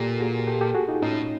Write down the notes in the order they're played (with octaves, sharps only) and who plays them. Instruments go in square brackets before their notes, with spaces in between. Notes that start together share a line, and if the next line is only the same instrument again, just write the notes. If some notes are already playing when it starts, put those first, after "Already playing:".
Already playing: [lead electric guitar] A#2 [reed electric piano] G4 A4
[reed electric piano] F#4 G#4
G4 A4
G4 A4
F#4 G#4
D#4 F4
[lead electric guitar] A2 [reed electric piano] C#4 D#4